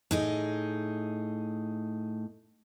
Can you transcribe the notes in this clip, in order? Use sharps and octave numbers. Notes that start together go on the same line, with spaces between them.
A2 D#4 G#4